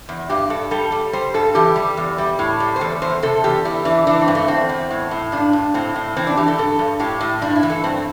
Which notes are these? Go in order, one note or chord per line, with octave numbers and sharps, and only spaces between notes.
E2
G2 G4
G2 A4
G3 A4
G3
G3 C5
G2 A4
E3 G4
G3
E2
G3
A2
G3
C5
E2 A4
E2 C5
C3 A4
E2 G4
G3 E4
E3 D4
E3 D4
C4
G2
A3
E2 C4
E2
A2
A2
G2 D4
G2
A2 C4
A2
E3 C4
D4
E3 G4
A4
G2 A4
G2
A2 G4
A2
G2 D4
E4
E3
A4
G2 C4